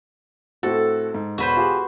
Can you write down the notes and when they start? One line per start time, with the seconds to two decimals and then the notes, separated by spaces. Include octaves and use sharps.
0.63 A2 C4 F#4 A4
1.14 G#2
1.38 E1 F#4 B4 C5
1.57 F4 G4 G#4